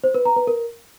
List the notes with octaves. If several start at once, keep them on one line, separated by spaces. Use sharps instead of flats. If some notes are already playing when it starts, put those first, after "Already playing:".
C5
B4
A#5
B4
A#4